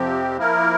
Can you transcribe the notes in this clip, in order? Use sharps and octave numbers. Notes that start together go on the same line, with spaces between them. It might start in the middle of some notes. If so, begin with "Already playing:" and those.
Already playing: F2 C3 F3 C4 G4
F3 A#3 E4 A#4